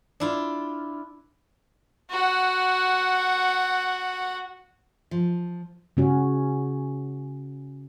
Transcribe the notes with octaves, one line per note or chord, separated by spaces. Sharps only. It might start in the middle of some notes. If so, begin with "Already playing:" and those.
D4 E4 F4
F#4 F#5
F3
C#3 C#4 F#4